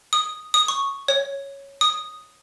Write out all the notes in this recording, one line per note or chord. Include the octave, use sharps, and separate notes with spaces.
D#6
D#6
C#6
C#5
D#6